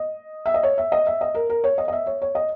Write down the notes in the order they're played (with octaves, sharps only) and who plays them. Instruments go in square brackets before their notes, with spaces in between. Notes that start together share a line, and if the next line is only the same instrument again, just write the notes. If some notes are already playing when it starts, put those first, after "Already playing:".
Already playing: [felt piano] D#5
E5
D#5
C#5
E5
D#5
E5
D#5
A#4
A#4
C#5
D#5
D#5
E5
C#5
C#5
D#5